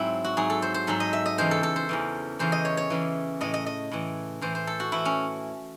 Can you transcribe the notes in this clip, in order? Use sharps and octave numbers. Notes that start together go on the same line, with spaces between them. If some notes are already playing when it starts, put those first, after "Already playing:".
Already playing: G#2 F#3 C4 E4
F#4
G#2 F#3 G#4
A4
C5
C5
G#2 F#3 A4
D#5
E5
D#5
E2 C#3 E3 C5
A4
A4
C5
E2 C#3 E3
E2 C#3 E3 C5
D#5
C#5
C#5
E2 C#3 E3
A2 E3 D#5
D#5
D#5
A2 E3
A2 E3 C5
C5
A4
F#4
A2 E3 E4
C#4